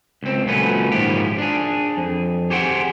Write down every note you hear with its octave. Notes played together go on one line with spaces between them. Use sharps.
C#2 C4
C#2 A#2 F#3 A3 C#4 B4
G#2 D#3 F3 E4 G4
D4 G#4
F2
G4 G#4 C5 F#5 G5